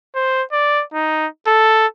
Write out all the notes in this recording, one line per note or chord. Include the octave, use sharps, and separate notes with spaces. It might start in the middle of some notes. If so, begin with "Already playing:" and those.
C5
D5
D#4
A4